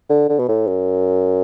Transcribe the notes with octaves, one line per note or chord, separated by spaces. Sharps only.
D3
D3
B2
A2
F#2